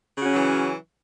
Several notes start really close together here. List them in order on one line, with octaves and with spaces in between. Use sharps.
C#3 F#4 C#4 F#3 E3